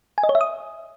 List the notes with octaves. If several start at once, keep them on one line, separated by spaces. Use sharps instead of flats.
G#5
D#5
C#5
E5
D#6